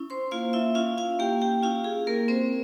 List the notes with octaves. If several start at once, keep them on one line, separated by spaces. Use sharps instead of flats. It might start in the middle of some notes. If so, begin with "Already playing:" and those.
Already playing: C#4 E4
C5 C6
A#3 F4 F5
E4 E5
C#4 E4 F4 F5
F4 F5
A#3 G4 G5
G4 G5
C#4 E4 F4 F5
G#4
A#3 A#4
C4 C5